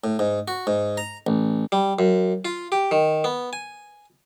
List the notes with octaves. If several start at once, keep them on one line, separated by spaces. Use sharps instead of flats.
A2
G#2
F#4
G#2
A#5
A1
G3
F#2
F4
G4
D#3
B3
G#5